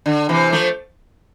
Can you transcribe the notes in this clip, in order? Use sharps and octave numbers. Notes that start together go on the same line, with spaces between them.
D3
C3 E3
F3 A3